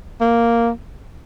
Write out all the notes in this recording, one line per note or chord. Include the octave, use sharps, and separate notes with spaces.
A#3